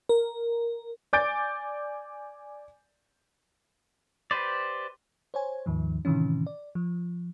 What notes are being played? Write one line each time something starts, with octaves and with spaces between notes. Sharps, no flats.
A#4
D5 G#5 D6 G6 A6 D7
G4 B4 C5 D5
C5 C#5 G#5
D#2 G#2 D#3 F3
A2 C3 D#3 E3 C#4
D5
F3